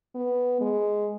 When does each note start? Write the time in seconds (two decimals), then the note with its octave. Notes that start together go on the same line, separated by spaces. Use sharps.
0.15 B3
0.61 G#3